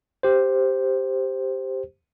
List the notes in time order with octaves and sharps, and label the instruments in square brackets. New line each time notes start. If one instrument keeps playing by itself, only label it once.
[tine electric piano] G4 C5